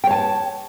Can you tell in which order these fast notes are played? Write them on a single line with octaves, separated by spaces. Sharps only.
G5 C#5 A5